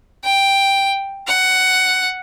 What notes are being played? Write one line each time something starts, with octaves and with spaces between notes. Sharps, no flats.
G5
F#5